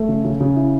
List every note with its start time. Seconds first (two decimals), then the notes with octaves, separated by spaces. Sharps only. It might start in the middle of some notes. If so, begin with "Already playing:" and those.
Already playing: A3
0.09 C#3
0.25 C#3
0.40 C#3
0.56 E4